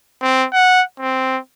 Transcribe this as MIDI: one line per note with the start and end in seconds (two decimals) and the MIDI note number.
0.22 0.46 60
0.53 0.82 78
1.00 1.38 60